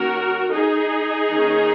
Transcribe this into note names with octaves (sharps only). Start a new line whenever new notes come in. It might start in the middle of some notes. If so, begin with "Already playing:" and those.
Already playing: D#3 A#3 C#4 F#4 A#4
D#4 G#4
D#3 A#3 C#4